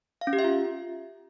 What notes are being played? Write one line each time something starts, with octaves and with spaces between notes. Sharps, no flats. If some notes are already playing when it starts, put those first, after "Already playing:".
F5
C#4
G4
E5
F4